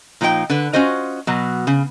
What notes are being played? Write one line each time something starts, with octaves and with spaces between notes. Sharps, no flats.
A#2 F3 D#4 F4 G5
D3 B4
C#4 F4 F#4 C5 D#5
B2 F#3
C#3